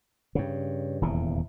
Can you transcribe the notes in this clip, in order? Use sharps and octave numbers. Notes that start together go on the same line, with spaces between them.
G2 C#3
D#1 E2 C3